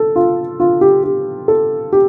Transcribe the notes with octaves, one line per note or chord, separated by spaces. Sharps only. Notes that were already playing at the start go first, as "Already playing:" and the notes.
Already playing: A4
F4
F4
G4
G4
A4
G4